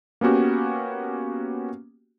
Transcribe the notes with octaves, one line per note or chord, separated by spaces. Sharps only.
A#3 B3 C#4 F#4 G4